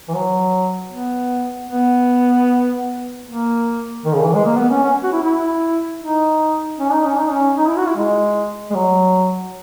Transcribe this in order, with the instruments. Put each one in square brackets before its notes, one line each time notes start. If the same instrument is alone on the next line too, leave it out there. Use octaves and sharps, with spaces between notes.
[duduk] E3
F#3
B3
B3
A#3
D#3
C#3
E3
G#3
A#3
B3
C#4
C#4
F#4
E4
E4
D#4
C#4
D#4
C#4
D#4
C#4
D#4
E4
F#4
E4
G#3
G#3
F#3